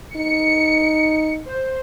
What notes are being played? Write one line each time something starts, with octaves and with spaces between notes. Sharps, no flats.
D#4 C#7
C5